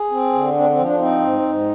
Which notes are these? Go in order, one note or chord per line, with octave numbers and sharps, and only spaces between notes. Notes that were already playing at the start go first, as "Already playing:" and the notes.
Already playing: G#4
C4
D3
C4 D4
C4
F3
D4
C4 D#4
G#2
G#2